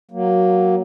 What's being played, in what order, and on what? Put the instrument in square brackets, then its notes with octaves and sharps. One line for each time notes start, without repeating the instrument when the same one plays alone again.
[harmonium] F#3 A#3